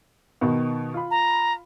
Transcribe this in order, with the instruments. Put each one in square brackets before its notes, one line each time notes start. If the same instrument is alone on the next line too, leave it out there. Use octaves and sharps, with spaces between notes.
[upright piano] B2 D#3 B3
F4 B5
[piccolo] A#5